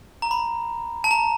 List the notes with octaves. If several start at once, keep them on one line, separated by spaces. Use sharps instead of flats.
A#5
B5
A5
A#5